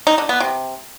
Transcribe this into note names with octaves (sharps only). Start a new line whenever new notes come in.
D#4
D3
B3
C3